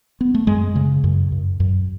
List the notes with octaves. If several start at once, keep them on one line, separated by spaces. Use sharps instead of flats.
B3
A3
F#2 G#3
C#3
F#2
F#2
F#2